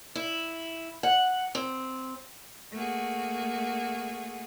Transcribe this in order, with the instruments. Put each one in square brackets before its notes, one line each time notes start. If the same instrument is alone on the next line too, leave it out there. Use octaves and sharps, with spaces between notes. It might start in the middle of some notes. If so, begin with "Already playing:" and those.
[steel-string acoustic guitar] E4
F#5
C4
[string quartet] A3 A#3 F#4 G#4